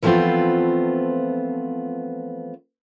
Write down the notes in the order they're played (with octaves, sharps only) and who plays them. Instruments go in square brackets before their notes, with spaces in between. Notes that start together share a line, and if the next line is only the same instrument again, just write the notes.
[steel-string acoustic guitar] E3 F3 A3 B3 C4 F4